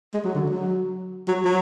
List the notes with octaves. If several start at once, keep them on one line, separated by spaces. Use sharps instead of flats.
G#3
F#3
D3
F#3
F#3
F#3